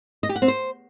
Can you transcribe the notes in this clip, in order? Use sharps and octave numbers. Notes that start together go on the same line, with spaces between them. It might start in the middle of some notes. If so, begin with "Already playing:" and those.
D#5
G4
F#5
C4
C5